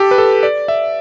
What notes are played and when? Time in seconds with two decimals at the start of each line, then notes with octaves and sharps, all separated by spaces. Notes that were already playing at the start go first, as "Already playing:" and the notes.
Already playing: G4 A4
0.11 B4
0.18 A4
0.43 D5
0.68 E5